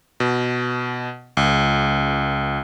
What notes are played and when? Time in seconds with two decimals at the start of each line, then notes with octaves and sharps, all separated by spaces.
0.20 B2
1.37 C#2